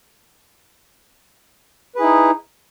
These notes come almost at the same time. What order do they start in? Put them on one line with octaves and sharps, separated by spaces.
B4 G#4 E4 D#4